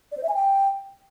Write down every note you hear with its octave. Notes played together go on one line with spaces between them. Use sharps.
D5
C5
E5
G#5
G5